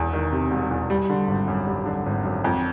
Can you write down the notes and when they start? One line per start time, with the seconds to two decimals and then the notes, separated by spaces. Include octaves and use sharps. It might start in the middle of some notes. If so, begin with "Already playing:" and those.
Already playing: E1 E2
0.13 D#3
0.32 C3
0.51 E1
0.71 E2
0.90 G3
1.10 D3
1.28 G#1
1.48 F#2
1.67 G3
1.86 D3
2.06 G#1
2.24 F#2
2.44 F2